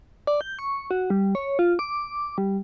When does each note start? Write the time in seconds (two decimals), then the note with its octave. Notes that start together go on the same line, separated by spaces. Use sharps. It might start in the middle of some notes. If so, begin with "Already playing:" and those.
0.27 D5
0.41 G6
0.59 C#6
0.91 F#4
1.10 G3
1.35 C#5
1.59 F4
1.79 D6
2.38 G3